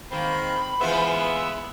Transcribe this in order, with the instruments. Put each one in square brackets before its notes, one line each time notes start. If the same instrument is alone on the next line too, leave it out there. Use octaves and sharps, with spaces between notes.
[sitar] G#2 D#3 A#3 [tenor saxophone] C4 [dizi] B5
[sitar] E3 F4 C5 [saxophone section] G#3 B3 [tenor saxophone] E5